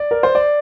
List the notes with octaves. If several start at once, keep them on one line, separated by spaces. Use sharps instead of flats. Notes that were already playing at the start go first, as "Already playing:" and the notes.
Already playing: D5
A#4
C5
D5